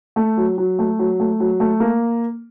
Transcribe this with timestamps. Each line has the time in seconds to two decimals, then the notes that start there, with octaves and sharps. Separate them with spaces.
0.16 A3
0.37 F#3
0.58 F#3
0.79 A3
0.99 F#3
1.20 A3
1.40 F#3
1.60 A3
1.80 A#3